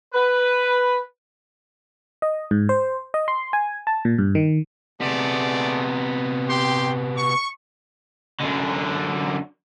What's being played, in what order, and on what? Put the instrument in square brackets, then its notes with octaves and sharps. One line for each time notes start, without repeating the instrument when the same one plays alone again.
[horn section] B4
[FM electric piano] D#5
G#2
C5
D#5
C6
G#5
A5
A#2
G2
D#3
[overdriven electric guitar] C3 B3 [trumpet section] A3 G#4 D5
[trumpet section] G4 G5 C6
C#6
[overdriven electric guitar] F#2 D3